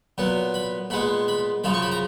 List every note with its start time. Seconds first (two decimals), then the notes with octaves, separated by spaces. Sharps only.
0.18 A#2 F#3 B3
0.54 B5
0.90 A#2 G#3 B3 B5
1.28 B5
1.64 F#2 C#3 F3 B5
1.74 C#6
1.82 B5
1.92 A#5